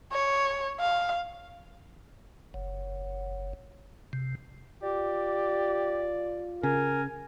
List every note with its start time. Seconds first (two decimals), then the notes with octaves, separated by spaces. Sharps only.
0.12 C#5
0.80 F5
2.54 F#1
4.13 C3
4.83 F4 G4 D5
6.63 C#3 A#4 G#5